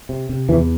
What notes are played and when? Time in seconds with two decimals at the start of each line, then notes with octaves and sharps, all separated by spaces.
0.09 C3
0.29 C3
0.49 E2 E3